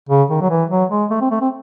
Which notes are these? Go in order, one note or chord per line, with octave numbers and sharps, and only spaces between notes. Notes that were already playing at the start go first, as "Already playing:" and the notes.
C#3
D#3
F#3
E3
F#3
G#3
A3
C4
A3
C4